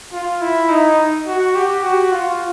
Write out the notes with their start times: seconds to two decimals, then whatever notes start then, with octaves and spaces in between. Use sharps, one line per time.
0.13 F4
0.41 E4
0.69 D#4
1.27 F#4
1.55 G4
1.83 F#4
2.12 F4